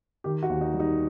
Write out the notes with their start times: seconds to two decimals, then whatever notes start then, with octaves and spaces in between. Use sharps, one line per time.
0.24 D#3 G4
0.43 F#4
0.49 D#2
0.61 D#4
0.74 G3
0.80 D#4